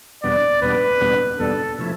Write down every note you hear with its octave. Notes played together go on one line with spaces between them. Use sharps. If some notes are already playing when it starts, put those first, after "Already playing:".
E2 B2 G3 B3 D4 D5
E2 B2 G3 B3 D4 B4
E2 B2 G3 B3 D4
E2 B2 G3 B3 D4 A4
C3 F3 A3 E4